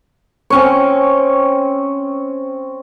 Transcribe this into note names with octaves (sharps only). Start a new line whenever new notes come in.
C4 C#4 C#5